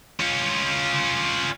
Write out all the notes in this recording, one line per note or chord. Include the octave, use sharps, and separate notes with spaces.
C#4 F4